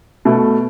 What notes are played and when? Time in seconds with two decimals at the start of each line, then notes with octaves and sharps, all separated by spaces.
0.25 B2 A3